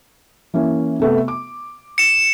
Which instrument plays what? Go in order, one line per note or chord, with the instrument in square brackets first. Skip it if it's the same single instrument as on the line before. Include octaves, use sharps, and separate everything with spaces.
[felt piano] E3 A#3 C#4
C3 A3 B3
D6
[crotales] C#7 E7